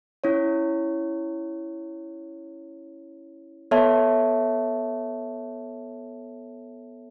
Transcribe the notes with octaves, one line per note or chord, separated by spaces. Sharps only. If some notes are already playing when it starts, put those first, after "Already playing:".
C#4 E4 C#5
B3 A4 C#5 E5 A5